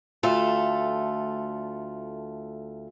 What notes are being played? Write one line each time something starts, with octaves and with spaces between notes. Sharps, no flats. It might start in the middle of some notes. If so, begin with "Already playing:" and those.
D2 A3 F4 A4